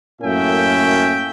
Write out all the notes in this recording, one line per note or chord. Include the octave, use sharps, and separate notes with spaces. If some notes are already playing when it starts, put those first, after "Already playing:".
F#2 A2 A#3 C#4 E5 G5